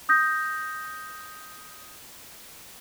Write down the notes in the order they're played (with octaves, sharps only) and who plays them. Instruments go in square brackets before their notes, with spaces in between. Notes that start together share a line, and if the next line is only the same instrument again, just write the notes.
[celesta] D#6 G6 A#6